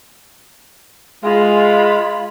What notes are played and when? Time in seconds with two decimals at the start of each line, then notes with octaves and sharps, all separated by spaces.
1.23 G#3 F4 B5